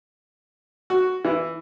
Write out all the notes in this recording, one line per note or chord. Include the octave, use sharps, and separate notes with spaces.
F#4
E3